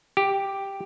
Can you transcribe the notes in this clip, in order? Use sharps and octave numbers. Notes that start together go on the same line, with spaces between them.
G4